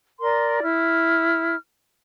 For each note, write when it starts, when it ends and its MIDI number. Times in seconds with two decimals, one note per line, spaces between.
0.21 0.61 70
0.21 0.61 74
0.21 0.61 84
0.63 1.56 64
0.63 1.56 89